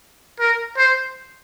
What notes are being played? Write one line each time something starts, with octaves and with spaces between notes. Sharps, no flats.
A#4
C5